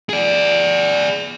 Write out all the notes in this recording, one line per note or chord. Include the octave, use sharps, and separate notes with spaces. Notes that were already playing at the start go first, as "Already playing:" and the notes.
G#4 D5